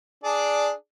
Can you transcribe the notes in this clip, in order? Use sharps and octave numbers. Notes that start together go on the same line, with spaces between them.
D4 G#4 D5